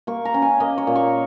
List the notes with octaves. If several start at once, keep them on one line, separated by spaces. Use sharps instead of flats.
A#3 C#6
A#5
C#4
G#5
A#3 D#5
C#5
A#2
C#6